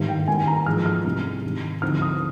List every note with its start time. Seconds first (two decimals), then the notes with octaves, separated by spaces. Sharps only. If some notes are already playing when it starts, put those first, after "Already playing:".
Already playing: G#1 G2 D#3
0.08 G5
0.27 G#1 G#2 D#3 A#3 G#5
0.47 A#5
0.66 G#2 F3 G#3 F6
0.86 F6
1.05 C2 C3 G3 D4
1.44 G#2 D#3 G3
1.82 D2 D3 F3 C4 D#4 F6
2.02 D#6